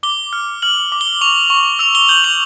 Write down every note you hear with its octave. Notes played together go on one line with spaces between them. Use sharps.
D6 G7
F6
F6 F#7
D6
G7
C#6 F7
C#6
E6 F7
G7
G6 F#7
F7